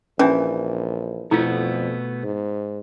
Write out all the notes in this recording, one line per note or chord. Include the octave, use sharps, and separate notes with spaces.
A#1 E3 C#4 D4
F2 B2 A3 B3 E4 F4
G#2